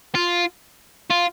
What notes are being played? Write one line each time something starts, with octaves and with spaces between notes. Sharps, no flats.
F4
F4